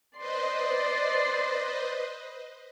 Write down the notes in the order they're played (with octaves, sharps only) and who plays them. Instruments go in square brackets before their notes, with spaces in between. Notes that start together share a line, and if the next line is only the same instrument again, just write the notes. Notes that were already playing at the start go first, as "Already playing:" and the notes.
[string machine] B4 C5 D#5 [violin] D5 C6